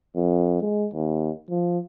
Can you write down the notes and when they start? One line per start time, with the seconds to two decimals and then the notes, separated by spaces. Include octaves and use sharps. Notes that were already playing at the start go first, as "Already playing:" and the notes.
0.16 F2
0.61 G#3
0.94 D#2
1.50 F3